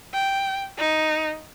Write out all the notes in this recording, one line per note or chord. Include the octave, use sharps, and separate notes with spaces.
G5
D#4